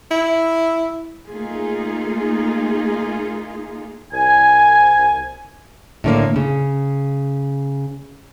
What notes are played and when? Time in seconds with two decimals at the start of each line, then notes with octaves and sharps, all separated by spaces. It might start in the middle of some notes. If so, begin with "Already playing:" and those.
0.11 E4
1.30 A3 A#3 D#4 F4 G#4
4.13 C2 G#5
6.04 A2 D3 A#3
6.36 C#3